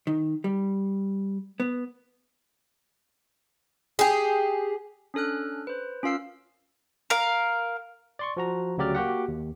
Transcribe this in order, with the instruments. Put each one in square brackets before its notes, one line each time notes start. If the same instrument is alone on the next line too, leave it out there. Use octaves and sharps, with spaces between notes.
[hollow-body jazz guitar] D#3
G3
B3
[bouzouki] G4 G#4
[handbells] C#4 D4 A4 F6 F#6
B4 C5
C#4 F4 A#4 F5 E6 C7
[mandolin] A#4 F5
[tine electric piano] D5 C6 C#6
F3 F#4 A#5
D2 C#3 F#3 G4 D5 F6
A#3 F#4 G4 F#5
D#2